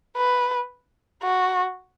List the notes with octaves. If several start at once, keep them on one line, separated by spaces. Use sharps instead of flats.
B4
F#4